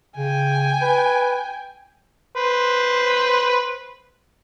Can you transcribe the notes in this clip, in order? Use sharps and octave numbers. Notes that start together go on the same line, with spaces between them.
C#3 G5 G#5
B4
B4 C5